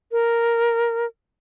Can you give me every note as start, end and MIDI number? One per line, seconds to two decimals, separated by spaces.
0.12 1.06 70